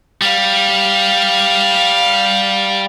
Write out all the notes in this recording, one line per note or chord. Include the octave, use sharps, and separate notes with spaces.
G3 F5